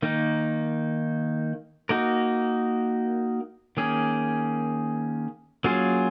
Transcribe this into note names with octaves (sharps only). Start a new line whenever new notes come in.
D#3 A#3 D#4
A#3 D#4 F#4 A#4
D#3 A#3 C#4 G#4
F#3 A#3 C#4 F4 G#4